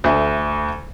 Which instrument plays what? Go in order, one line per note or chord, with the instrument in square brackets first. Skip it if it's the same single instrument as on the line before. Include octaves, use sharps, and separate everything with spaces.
[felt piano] D2 A3